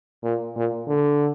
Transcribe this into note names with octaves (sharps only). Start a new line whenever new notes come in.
A#2
A#2
D3